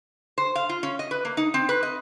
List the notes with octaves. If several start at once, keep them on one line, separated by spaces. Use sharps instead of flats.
C5
F5
F4
C#4
D#5
B4
A#3
D#4
C4
B4
D#5